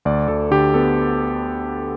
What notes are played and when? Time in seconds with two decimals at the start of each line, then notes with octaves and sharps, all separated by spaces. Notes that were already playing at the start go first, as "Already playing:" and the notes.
0.05 D2 D5
0.28 D2 A4
0.51 D3 G4
0.74 B3 A4